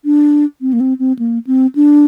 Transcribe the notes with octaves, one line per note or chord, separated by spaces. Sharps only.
D4
C4
A#3
C4
C4
A#3
C4
D4